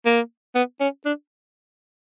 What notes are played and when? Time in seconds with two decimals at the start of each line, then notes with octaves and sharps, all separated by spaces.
0.06 A#3
0.55 B3
0.80 C#4
1.05 D4